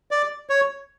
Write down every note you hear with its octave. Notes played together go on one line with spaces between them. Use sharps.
D5
C#5